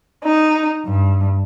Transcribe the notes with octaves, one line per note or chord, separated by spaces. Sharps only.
D#4
G2